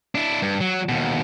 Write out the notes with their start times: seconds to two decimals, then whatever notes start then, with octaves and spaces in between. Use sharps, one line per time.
0.15 D4 E4
0.42 G2
0.61 F#3
0.89 D#2 B2